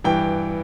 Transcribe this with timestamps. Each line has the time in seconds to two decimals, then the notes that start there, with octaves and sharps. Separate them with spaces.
0.04 G2 E3 G5